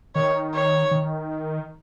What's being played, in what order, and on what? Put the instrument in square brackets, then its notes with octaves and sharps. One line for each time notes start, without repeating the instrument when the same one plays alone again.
[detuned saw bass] D#3 [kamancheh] C#5
[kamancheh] C#5
[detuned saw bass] D#3